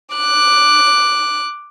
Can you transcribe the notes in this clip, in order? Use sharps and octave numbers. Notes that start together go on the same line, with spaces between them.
D6 F#6